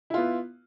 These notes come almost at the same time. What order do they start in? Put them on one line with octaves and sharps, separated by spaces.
E4 F4 B3